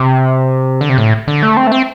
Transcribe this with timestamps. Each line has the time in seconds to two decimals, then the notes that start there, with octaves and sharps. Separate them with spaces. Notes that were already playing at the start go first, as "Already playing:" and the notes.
Already playing: C3
0.81 D3
0.89 C3
0.98 A2
1.28 D3
1.43 A3
1.57 C4
1.67 A3
1.72 C4